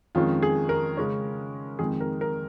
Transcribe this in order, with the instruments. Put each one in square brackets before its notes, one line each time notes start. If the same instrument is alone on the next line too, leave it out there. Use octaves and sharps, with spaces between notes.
[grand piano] F2 D#3 G#3 C#4 F4
G#4
A#4
C#3 G#3 C#4
F2 D#3 G#3 G#4
A#4
A#4